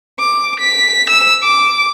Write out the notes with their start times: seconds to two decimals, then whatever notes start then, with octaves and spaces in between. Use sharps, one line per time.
0.20 D6
0.60 B6
1.10 E6
1.43 D6